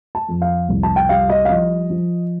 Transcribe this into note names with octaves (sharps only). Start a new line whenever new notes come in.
A5
F2
F5
C2
A5
G5
G3 F5
D#5
F5
F3 D#5
F3